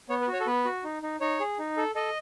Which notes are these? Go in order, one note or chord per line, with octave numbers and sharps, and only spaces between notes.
B3 C#5
B4
F#4
C#5
A4
B3 B4
F#4
D#4
D#4
D#4 C#5
G#4
D#4
A4
A4 D#5